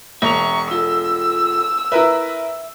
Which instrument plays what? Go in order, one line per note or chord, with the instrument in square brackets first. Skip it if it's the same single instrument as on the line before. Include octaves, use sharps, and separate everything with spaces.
[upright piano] E1 F7 [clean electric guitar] E5 A5 A#5 [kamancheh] C#6
[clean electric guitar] F4 A4 [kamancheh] E6
[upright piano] E4 A#4 B4 [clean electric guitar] E5